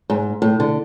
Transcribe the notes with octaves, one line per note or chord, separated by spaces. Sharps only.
G#2
A2
D3